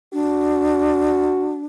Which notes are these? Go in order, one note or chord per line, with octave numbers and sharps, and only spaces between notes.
D4 F#4